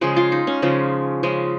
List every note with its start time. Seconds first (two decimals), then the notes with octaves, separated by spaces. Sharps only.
0.01 C#3 F3 G#3 G#4
0.16 F4
0.32 D#4
0.47 C#4
0.62 C#3 F3 G#3
1.23 C#3 F3 G#3